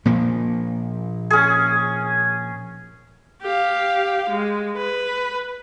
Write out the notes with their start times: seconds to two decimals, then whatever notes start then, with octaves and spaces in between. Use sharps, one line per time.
0.05 A#2 F3 A#3
1.30 C#4 G#4
3.42 G4 F5
4.30 G#3
4.77 B4